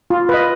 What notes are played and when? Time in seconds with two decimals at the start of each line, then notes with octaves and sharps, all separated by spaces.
0.10 F4
0.29 B4 D#5